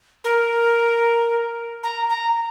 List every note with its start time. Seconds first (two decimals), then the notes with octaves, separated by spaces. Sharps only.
0.24 A#4
1.83 A#5
2.09 A#5